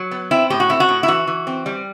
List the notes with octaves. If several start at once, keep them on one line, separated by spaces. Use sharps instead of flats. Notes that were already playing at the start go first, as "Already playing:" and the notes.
Already playing: F#3
B3
C4 E4
A2 G4
F#4
C4 E4
F#4
A2
E4
E3 F#4
E3
C4
G3